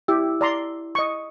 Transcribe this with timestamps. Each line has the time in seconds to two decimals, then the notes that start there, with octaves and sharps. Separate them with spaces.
0.08 E4 G4
0.41 D5 A#5 C6
0.95 D#5 C#6